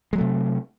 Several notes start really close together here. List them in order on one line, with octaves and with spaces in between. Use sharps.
G#3 F#3 A3 C3